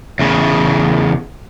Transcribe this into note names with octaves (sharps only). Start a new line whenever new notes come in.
E2 C#3